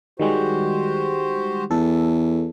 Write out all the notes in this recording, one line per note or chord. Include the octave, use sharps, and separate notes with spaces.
D#3 G3 G#3 F#4 G4 C5
E2 A4